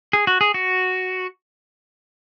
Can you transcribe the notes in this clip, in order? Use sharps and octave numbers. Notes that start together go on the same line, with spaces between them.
G#4
F#4
G#4
F#4